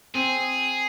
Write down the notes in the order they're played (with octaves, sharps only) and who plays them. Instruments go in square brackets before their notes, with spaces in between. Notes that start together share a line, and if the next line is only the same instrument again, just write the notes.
[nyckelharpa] C4 [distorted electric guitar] G#4